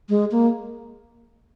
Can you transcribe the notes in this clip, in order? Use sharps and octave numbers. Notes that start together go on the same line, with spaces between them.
G#3
A#3